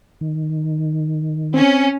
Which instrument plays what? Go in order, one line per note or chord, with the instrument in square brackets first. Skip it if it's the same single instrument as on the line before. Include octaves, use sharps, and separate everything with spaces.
[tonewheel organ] D#3
[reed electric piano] C4 [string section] C#4